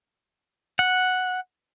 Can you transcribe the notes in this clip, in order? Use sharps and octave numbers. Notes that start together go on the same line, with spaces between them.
F#5